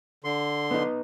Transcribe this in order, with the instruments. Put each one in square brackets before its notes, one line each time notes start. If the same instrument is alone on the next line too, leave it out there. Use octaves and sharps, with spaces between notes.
[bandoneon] D3 C6
[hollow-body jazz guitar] B3 D#4